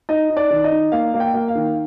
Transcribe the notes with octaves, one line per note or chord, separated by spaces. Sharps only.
D#4 D#5
D#4
D5
D#3
D#5
D#4
A#3 F5
A#3
G5
A#3
F5
D#3